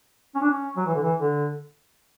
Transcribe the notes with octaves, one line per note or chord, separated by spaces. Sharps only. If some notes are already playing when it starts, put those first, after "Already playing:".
C#4
D4
C#4
F#3
E3
D3
E3
D3